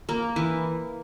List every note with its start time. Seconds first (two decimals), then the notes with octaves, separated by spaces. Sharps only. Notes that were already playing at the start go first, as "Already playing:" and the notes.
0.09 A#3
0.36 E3